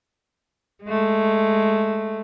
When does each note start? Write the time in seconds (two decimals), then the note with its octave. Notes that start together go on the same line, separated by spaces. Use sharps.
0.84 G#3 A3